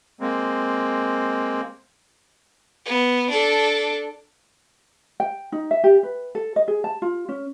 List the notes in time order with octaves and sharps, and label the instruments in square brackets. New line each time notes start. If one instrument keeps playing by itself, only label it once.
[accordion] G#3 A#3 C4
[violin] B3
D4 A4
[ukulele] G5
D#4
E5
G4
B4
A4
D#5
G#4
A5
F4
C#4